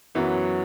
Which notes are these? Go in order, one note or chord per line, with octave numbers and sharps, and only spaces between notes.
F#2 E3 F#3 B3 E4